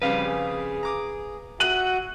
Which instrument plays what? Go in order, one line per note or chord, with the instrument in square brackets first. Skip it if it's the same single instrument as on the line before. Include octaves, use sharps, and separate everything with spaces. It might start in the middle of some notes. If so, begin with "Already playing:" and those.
[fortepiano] F2 C#3 G3 [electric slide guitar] B4 F5
[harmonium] G#4
[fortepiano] A#5 D6 D#6
[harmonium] F#4 E5 F#5 [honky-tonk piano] F#6 D#7 F#7